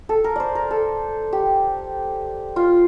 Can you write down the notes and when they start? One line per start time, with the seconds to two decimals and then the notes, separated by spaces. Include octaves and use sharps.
0.09 A4
0.24 A#4
0.36 C5 D5
0.55 A#4
0.71 A4
1.32 G4
2.56 F4